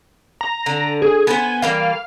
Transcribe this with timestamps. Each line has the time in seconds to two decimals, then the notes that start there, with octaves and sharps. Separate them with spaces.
0.41 A#5
0.66 D3
1.02 G#4
1.27 B3 B4 C5 G#5
1.62 E3 G3 A#3 F5